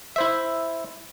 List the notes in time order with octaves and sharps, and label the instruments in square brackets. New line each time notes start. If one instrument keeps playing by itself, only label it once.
[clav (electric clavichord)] E4 C5 E5